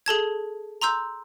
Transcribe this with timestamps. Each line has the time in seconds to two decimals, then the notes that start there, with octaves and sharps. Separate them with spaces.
0.06 G#4 A4 A5 G#6
0.82 A#5 C6 E6 G6